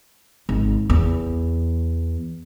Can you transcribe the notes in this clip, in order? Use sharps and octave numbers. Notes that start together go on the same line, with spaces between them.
G#1
E2